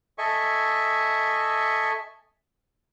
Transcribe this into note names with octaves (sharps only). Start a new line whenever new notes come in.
A4 D#5 E5 G#5 C#6